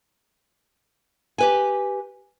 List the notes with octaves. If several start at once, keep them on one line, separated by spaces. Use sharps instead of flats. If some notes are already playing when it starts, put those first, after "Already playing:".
G4 B4 G#5